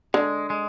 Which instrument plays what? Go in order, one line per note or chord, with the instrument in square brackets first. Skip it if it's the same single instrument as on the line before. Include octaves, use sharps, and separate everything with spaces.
[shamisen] D3 [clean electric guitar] G#3
[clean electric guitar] G#3